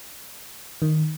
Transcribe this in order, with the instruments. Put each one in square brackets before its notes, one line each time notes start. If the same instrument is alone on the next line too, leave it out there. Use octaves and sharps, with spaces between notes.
[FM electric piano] D#3